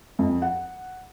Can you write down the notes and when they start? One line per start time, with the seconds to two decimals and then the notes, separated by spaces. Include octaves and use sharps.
0.19 F2
0.42 F#5